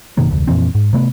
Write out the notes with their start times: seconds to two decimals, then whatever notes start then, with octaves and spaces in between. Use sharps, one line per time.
0.17 F#1 B2 D#3 A#3
0.31 F1 D2
0.48 F2 A#2 E3 C4
0.75 G#2
0.93 C3 A3 B3